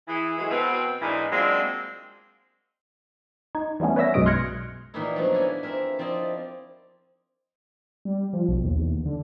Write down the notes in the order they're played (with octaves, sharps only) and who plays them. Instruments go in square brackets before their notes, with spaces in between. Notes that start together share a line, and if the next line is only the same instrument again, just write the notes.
[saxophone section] E3 G#4
E3 F#3 G#3 A3 G#4
B2 C4 B4
G#2 E3 G#3 A#3 D4 D#4
F#3 G#3 A#3 C4 D4 F4
[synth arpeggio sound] D#4 G#6
E3 G3 A3 B3 C#4
B4 C#5 D5 E5 E6 A#6
B1 F#2 B2 G#3 D#6 D7
C6 F6 F#6 G#6 A#6 C#7
[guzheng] A#2 D#3 E3 A#3 D#4 E4
F3 F#3 A3 B3 D4
A#3 E4 B4 G#5
C4 A#4 E5
F3 C4 E4 D5 D#5
[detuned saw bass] G3
F3
B1
D#2
E2
D#2
D3